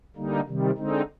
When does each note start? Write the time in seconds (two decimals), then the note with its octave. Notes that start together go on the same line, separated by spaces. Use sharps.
0.16 D3 G3 A#3 D#4
0.47 C3 D#3 G3
0.77 D3 G#3 C4 D#4